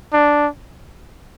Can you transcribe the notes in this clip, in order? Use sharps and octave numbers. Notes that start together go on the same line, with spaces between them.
D4